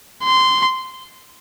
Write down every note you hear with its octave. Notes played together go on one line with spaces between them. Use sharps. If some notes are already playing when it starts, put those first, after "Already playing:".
C6